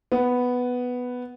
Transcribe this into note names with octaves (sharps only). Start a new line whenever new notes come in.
B3